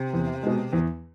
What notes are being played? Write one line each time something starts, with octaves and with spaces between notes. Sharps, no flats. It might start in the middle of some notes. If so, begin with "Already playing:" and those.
Already playing: C3
E2
B2 G#3
E2